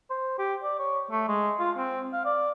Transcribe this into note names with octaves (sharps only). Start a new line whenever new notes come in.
C5
G4
D5
C#5
A3
G#3
F4
C4
F5
D5